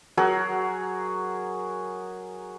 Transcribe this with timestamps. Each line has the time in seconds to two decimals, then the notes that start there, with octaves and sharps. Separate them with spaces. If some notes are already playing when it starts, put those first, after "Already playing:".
0.17 F#3 F#4 G#4 A#4